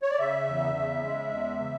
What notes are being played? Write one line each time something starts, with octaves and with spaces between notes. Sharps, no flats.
C#5
D5
C#3 E5
E2
C#3
G#3
E2
C#3